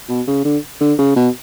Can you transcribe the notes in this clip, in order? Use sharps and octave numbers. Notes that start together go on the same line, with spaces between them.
B2
C#3
D3
D3
C#3
B2